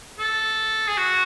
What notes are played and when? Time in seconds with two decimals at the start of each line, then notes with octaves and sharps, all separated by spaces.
0.19 A4
0.88 G#4
0.97 F#4